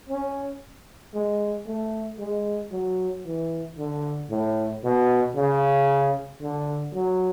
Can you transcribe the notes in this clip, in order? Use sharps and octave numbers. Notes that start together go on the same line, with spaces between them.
C#4
G#3
A3
G#3
F#3
E3
D3
A2
B2
C#3
D3
F#3